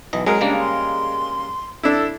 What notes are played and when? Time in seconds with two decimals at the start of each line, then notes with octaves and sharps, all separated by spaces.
0.13 B1 E3 D#5
0.26 F#3 G#3 A#4
0.41 C#3 G3 A#3 D4
0.59 C6
1.83 D4 E4 A4